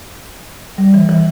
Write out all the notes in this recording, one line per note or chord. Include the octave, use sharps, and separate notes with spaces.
G3
E3
E3